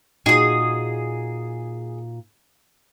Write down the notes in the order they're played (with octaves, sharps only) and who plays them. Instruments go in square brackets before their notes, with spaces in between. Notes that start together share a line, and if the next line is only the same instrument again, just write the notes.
[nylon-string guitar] A#2 D#4 F#4 [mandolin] G#4 D#6